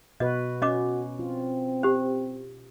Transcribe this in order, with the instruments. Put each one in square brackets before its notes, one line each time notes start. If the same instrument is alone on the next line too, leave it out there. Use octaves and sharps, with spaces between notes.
[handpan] B2 F#4 B4 [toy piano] D#5
[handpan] C#4 [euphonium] F#4 [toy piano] C#5 D#5 D6
[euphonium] C4 [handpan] F4
[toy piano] G4 C5